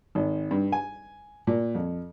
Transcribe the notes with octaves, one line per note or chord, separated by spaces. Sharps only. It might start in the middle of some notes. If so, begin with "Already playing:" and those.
G#1
G2
G#5
A#2
F2